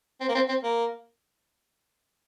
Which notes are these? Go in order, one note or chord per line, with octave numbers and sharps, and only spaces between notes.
C4
A#3
C4
C4
A#3